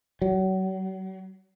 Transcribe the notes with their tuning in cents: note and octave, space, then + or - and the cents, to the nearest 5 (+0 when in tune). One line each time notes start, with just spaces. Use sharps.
F#3 +35